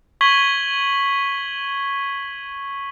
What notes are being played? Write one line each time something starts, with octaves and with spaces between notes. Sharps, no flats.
C#6 G#6 B6 F#7 G7